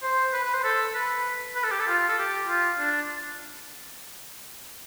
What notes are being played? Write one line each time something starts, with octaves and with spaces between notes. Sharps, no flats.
C5
B4
B4
C5
A4
B4
B4
A4
G4
A4
F4
A4
G4
F4
D4